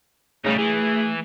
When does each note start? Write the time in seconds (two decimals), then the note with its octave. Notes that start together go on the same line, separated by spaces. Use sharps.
0.45 C#3 G3 A3 D#4
0.58 E3 G#4